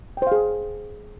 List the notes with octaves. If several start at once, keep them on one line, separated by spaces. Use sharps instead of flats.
G#4 C5 F5 G5